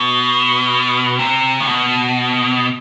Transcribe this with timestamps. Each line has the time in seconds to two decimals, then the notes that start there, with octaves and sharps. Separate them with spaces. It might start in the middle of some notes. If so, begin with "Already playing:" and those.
Already playing: B2
1.19 C3
1.61 A2
1.68 B2